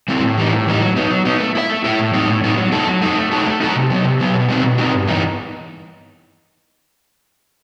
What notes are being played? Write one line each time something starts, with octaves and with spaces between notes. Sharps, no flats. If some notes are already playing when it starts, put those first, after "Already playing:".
G3 C4 E4 A4
A2
E3 G3 D#4
A2
E3 G3 D#4
F#3
B3 D#4
F#3
B3 D#4
A3
E4 A4 E5
A3
E4 A4 E5
A2
G3 B3 D#4
A2
G3 B3 D#4
F#3
A3 D#4 A4
F#3
A3 D#4 A4
A3
D#4 F#4 A4
A3
D#4 F#4 A4
C3
F#3 B3
C3
F#3 B3
B2
G3 C4 D#4 F#4
B2
G3 C4 D#4 F#4
G2
E3 B3 D#4